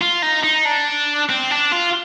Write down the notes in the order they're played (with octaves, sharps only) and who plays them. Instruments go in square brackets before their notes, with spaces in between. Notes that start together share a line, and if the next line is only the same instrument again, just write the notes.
[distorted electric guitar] F4
D#4
D#4
D4
C4
D4
F4